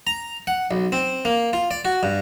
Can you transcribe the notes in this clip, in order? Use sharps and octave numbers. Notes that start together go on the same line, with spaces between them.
A#5
F#5
B1
C4
A#3
F4
D5
F#4
G2